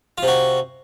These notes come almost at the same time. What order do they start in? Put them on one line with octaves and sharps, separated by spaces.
F4 C3 F#4